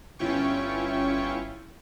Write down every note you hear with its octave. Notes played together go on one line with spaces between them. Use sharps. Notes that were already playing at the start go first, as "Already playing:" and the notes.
G1 C#4 E4 F4 G5 C#6